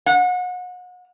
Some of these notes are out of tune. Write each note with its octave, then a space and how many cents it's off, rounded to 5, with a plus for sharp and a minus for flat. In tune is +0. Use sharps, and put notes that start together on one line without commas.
F#5 -35